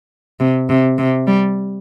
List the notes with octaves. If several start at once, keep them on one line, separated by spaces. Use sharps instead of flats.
C3
C3
C3
G3